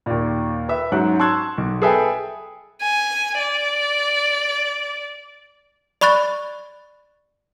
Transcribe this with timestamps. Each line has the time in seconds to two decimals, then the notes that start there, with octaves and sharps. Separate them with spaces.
0.06 D#2 A#2
0.69 B4 E5
0.92 G#2 F#3 C#4 F#6
1.19 A5 C6 C#6 E6 F#6 G#6
1.58 B1
1.82 G#4 A4 B4 E5 G5 G#5
2.82 G#5
3.39 D5
6.01 D5 B5 C#6 F#6 A6